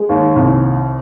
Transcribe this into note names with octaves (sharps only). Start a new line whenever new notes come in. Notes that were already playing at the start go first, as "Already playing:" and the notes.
Already playing: G#3
D#2
C2